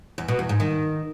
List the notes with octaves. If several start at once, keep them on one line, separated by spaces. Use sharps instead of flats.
E2
B2
E2
G#2
D#3